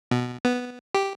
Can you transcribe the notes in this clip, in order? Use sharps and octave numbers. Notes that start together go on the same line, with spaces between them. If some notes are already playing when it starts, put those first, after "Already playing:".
B2
B3
G4